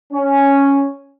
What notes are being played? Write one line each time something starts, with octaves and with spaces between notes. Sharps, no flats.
C#4